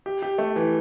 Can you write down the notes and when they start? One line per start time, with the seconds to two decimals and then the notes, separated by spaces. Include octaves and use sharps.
0.06 G4
0.22 G4
0.38 A3
0.56 E3